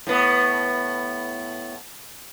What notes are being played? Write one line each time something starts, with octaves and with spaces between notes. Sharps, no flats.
A2 B3